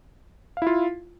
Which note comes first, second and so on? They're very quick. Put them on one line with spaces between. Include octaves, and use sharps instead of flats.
F5 E4 F4